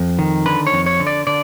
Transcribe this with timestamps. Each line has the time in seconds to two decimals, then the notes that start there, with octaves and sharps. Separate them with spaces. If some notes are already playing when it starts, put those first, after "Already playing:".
Already playing: F2
0.19 D#3
0.46 D3 B4
0.67 C#5
0.72 F2
0.86 C#5
1.00 D3
1.07 D5
1.27 D3 D5